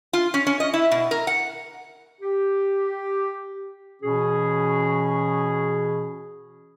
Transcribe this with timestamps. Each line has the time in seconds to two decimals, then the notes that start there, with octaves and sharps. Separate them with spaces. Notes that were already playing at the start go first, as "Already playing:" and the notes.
0.13 F4
0.34 C#4
0.47 C#4
0.60 D#5
0.74 E4
0.92 B2
1.11 A#4
1.27 F#5
2.21 G4
4.03 B2 E3 C#4 F#4 G#4